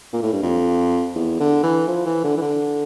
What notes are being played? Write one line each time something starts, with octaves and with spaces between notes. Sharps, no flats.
A#2
A2
G2
F2
E2
D3
E3
F3
E3
D3
E3
D3